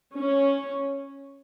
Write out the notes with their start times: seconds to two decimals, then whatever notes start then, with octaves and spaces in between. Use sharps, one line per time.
0.16 C#4